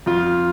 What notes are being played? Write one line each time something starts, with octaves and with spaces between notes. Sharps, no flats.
F2 F4